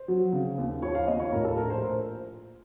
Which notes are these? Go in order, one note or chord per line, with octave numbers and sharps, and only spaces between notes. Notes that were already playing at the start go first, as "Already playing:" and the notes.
Already playing: C5
F#3
C#3
D#2
F3 C#5
F5
D#2 D#5
C#5
A2 A#4
A4
A#1 A#4
C5